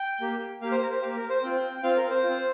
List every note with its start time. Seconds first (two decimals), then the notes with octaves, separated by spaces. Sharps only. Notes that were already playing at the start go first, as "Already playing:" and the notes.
Already playing: G5
0.21 A#3 G4
0.62 A#3 G4 F5
0.72 C5
0.82 A#4
0.91 C5
1.02 A#3 G4 F5
1.16 A#4
1.29 C5
1.43 C4 F4 G5
1.76 G5
1.83 C4 F4 F5
1.96 A#4
2.10 C5
2.23 C4 F4